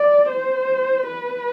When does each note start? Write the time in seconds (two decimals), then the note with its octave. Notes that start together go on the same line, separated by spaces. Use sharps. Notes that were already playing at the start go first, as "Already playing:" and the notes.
Already playing: D5
0.29 C5
1.08 B4